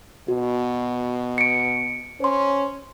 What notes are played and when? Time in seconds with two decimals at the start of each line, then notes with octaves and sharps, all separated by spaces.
0.28 B2 F#4
1.38 C#7 D7
2.20 C#4 C5 C6